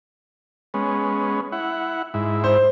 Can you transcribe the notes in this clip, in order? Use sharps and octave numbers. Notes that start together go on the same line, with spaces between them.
G#3 B3 C#4
E4 F#5
G#2 E4
C5